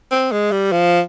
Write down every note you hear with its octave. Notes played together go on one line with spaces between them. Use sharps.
C4
G#3
G3
F3